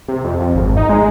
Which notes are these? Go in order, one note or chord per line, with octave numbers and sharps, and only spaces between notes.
C3
F2
F2
G#1
D#4
G#3